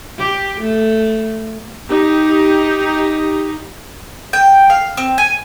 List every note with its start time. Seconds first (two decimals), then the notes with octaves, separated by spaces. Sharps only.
0.19 G4
0.60 A3
1.88 D#4 G4
4.33 G5
4.70 F5
4.97 C4
5.18 G#5